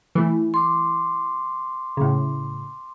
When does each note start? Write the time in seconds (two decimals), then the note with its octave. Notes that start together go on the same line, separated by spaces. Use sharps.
0.15 E3 A3
0.54 C6 D6
1.97 A2 C#3